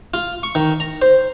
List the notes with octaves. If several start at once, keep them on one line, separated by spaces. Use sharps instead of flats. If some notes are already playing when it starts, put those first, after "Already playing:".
F4
C#6
D#3
A#5
C5